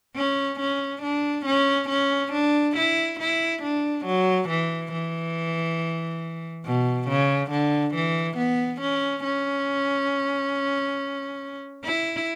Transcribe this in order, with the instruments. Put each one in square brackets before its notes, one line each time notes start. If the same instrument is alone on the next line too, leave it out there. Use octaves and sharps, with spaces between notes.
[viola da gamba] C#4
C#4
D4
C#4
C#4
D4
E4
E4
D4
F#3
E3
E3
B2
C#3
D3
E3
B3
C#4
C#4
E4